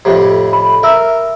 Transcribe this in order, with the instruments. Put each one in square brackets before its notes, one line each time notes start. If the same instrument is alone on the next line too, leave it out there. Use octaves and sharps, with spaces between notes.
[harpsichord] F2 A2 C3
[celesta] B5
[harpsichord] A#4 [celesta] E5 E6